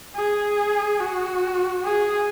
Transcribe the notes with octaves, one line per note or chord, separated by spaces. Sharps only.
G#4
F#4
G#4